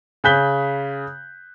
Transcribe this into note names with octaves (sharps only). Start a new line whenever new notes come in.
C#3 G#5 F#6 G6 B6 G7